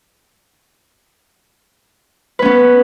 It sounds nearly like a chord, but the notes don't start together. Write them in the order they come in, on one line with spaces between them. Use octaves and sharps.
B4 C#4 B3